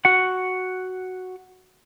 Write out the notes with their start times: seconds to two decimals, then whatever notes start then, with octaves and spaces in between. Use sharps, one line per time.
0.05 F#4 F#5